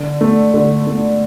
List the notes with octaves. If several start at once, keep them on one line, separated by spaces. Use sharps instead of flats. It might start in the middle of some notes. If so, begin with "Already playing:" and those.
Already playing: D3
A3
D3
A3